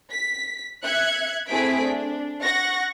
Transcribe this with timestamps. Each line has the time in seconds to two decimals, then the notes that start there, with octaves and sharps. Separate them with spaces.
0.12 B6
0.83 E5 F#6 G#6 C#7
1.50 A3 C4 E4 G#4 B6 D7
1.82 D4
2.43 F#5 C#6 A#6